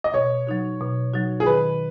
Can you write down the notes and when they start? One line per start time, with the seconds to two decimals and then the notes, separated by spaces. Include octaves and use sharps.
0.04 D#5
0.14 B2 C#5
0.47 F#3 D#4 F#4
0.80 B2
1.13 F#3 D#4 F#4
1.40 G#4
1.46 D#3 B4